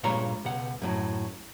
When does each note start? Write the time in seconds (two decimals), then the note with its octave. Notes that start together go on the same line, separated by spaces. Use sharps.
0.03 G2 A#2 G#3 F4 C#5 A#5
0.45 C#2 B2 F#5
0.82 F#2 A2 F#3